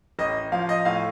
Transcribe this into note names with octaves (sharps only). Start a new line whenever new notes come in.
A1 D#5
F3 F5
D#5
A2 F5